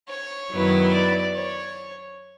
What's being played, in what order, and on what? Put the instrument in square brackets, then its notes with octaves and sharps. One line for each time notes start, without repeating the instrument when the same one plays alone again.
[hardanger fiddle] C#5
[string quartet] F#2 D#3 F#3 B3 E4
[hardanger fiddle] D5
C#5